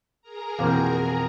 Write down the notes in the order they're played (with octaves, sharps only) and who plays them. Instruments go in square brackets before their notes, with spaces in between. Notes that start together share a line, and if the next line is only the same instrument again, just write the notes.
[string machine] G#4 A#4 A#5
[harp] F2 B2 [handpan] E3 C4 C5 [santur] A#3